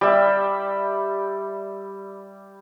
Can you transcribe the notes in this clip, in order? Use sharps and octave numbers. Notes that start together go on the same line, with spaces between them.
G3 E5